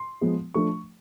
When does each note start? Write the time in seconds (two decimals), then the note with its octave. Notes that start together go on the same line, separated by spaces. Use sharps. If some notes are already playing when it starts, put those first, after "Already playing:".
Already playing: C6
0.21 F3 G#3 B3
0.54 F3 A3 D4 C#6